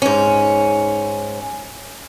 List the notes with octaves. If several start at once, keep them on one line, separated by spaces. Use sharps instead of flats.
G#2 C#4